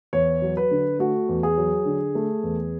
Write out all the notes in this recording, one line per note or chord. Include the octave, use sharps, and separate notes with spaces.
E2 C#5
F#3
B4
D3
A3 F#4
E2
G#4
F#3
D3
A3
E2